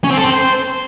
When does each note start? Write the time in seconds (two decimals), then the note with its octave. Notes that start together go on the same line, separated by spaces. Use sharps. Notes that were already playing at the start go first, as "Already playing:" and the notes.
0.04 C#4
0.11 C4
0.17 A4
0.24 C4
0.30 C5